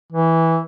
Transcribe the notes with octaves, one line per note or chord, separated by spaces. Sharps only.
E3